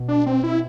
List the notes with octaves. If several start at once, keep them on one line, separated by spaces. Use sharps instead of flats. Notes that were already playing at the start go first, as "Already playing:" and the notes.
Already playing: B2
D4
C4
E4